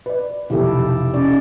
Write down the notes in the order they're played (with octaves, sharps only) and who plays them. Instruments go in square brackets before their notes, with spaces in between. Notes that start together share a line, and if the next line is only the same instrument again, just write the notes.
[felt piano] B4 D5
[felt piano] F1 B1 [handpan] E4 G4 A4
[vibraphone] C#4 [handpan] D#4 D5